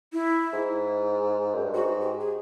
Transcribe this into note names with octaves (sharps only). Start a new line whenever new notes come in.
E4
G#2
F#2
G2
G#2 F#4
G4
G#4